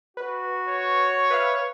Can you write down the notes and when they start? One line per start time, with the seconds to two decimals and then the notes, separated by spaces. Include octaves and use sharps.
0.17 F#4 B4
0.69 C#5
1.30 B4 E5 F5